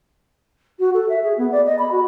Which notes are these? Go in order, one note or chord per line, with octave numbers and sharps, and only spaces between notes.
F#4
A4
E5
G#4
B3
D5
D#5
B5
F#4